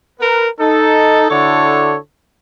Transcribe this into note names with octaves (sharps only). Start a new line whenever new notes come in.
A#4 B4
D#4 A4
D3 E4 F#4 A4 C#5 D5